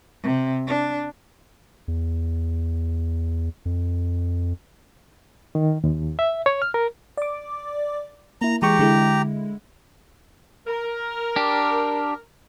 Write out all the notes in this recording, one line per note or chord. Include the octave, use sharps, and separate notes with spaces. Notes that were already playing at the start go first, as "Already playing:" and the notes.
C3
D4
E2
F2
D#3
D#2
E5
C#5
F6
A#4
D5 D6
A#3 E4 A#5
E3 G#3 G4 A#5 C#6
D3 G#3 E4
A#4
D4 G4